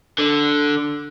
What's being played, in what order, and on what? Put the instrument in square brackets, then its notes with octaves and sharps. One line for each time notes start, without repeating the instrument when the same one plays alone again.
[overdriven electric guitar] D3